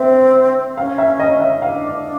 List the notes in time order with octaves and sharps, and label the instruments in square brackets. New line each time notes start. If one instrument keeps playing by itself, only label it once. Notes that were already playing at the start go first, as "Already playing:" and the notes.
Already playing: [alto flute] C4 [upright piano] E5
[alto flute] C#4 [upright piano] F5
[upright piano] E5
D#5
E5
[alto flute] D4 [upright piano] F5
[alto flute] D4